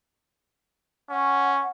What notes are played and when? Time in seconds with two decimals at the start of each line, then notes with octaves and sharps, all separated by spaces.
1.10 C#4 F#5